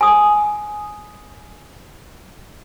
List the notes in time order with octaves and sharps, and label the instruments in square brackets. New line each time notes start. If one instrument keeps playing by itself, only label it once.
[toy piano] G#5 D#6